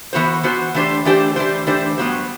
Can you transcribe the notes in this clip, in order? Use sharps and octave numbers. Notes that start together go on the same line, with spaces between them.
E3 B3 F#4 C5
E3 B3 F#4 C5
E3 A3 D4 G4 C5
E3 A3 D4 G4 C5
E3 A3 D4 G4 C5
E3 A3 D4 G4 C5
G2 F#3 B3 F#4 C5